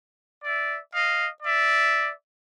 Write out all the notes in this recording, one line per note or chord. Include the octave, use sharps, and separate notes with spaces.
D5 E5
D#5 F5
D5 E5